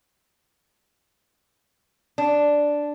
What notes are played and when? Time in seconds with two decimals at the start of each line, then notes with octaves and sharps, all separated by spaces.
2.18 D4